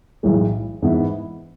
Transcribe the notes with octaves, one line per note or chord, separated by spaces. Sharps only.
B1 A2 E3 G#3
G#2 E3 B3 E4